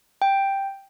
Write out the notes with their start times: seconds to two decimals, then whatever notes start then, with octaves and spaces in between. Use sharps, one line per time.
0.22 G5